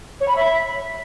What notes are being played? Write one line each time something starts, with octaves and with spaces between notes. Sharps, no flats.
C#5
B5
E5